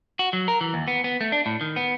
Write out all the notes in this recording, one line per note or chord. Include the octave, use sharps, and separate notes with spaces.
F#4
F#3
A#4
E3
D#2
B3
B3
A3
D4
A2
D#3
B3